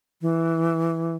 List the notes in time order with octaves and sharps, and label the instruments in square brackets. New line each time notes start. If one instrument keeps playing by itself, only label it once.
[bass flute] E3